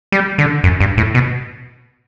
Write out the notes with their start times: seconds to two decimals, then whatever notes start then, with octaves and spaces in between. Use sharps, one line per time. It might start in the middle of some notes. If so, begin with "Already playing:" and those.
0.12 G3
0.38 D3
0.64 F#2
0.80 G2
0.97 A2
1.14 B2